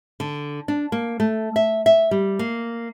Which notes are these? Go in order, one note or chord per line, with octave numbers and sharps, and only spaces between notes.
D3
D4
A#3
A3
E5
E5
G3
A#3